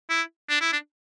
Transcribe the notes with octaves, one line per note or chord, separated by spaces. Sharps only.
E4
D4
E4
D4